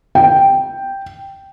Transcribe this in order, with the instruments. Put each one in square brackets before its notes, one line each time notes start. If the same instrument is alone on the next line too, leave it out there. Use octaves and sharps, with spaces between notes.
[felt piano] G5